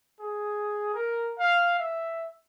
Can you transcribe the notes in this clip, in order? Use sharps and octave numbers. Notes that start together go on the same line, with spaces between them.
G#4
A#4
F5
E5